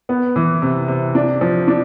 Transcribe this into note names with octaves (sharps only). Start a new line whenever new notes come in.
B3
E3
C3
C3
D4
F3
D4